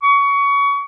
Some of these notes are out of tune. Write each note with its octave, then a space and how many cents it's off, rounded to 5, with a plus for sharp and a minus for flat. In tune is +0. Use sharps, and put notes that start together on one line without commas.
C#6 +25